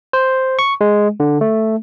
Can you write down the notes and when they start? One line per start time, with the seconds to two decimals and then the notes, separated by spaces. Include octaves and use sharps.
0.13 C5
0.59 C#6
0.81 G#3
1.20 D3
1.41 A3